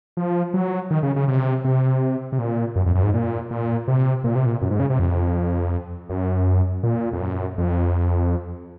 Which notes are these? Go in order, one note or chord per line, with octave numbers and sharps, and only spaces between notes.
F3
F#3
D#3
C#3
C#3
C3
C3
C3
A#2
F#2
F2
F#2
G#2
A#2
A#2
C3
A#2
C3
A#2
F#2
G#2
C#3
C3
F2
F#2
A#2
F2
F#2
F2